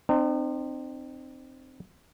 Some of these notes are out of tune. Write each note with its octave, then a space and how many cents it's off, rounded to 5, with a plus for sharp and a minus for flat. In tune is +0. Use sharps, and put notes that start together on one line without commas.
C4 +0 D#4 -45